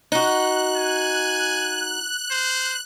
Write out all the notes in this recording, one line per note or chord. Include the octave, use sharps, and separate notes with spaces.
D#4 F#4 F#6
G#5
C5